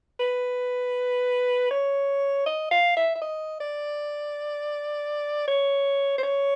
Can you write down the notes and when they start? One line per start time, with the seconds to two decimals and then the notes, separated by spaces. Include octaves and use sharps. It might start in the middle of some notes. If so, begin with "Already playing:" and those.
0.20 B4
1.71 C#5
2.46 D#5
2.71 F5
2.97 E5
3.16 E5
3.21 D#5
3.60 D5
5.48 C#5
6.18 C5
6.23 C#5